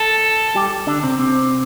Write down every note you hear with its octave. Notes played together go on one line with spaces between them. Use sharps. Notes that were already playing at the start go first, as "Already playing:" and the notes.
Already playing: A4
G3 G4
D3 D4
C3 C4
C3 C4